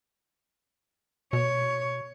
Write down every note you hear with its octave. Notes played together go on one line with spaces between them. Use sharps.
B2 C#5